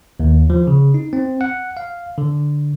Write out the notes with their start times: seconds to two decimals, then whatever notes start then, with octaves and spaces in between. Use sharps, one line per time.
0.20 D#2
0.50 F3
0.67 C#3
0.94 D#4
1.13 C4
1.41 F#5
1.77 F5
2.18 D3